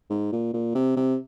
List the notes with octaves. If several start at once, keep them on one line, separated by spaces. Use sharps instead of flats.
G#2
A#2
A#2
C3
C3